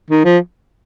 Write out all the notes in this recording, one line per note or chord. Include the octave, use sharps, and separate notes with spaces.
D#3
F3